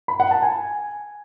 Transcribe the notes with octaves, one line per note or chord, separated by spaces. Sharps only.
B5
F#5
A5
G#5